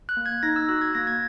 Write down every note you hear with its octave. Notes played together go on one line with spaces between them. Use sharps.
F#6
A#3
G#6
D#4 A#6
E6
F#4 F#6
G#6
A#3 A#6
G#6